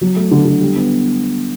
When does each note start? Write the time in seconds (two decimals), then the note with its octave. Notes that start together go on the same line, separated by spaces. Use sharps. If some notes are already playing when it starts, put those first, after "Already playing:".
0.01 F#3
0.16 A3
0.31 D3
0.45 D3
0.60 G3
0.76 B3